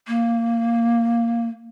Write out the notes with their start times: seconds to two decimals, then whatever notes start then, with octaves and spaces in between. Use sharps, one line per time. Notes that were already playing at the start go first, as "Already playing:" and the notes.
0.08 A#3